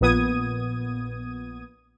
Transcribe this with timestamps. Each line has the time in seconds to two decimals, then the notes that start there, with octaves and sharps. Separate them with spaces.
0.01 A#1 A#2 B3 D#6 G#6 D#7